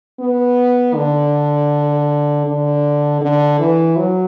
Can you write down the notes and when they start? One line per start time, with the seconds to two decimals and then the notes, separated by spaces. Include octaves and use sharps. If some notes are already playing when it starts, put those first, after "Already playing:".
0.19 B3
0.95 D3
2.46 D3
3.21 D3
3.59 E3
3.97 F#3